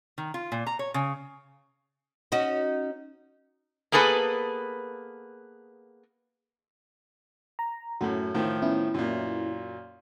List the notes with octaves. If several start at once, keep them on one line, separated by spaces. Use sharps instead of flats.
D#3
F4
A#2
A#5
C#5
C#3
C#4 D#4 F#4
A#3 B3 G#4 A4 B4
A#5
F#2 A2 A3 F#4
A2 D#3 F3
B3 C#4 E4
F#2 A#2